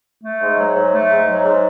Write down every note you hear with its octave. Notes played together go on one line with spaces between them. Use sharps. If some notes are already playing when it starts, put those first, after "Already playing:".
A3
G#2
F#3
G#2
A3
G#2
F#3
G#2